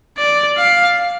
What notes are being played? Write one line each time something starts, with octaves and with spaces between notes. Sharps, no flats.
D5
F5